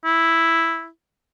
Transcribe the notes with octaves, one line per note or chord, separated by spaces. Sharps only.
E4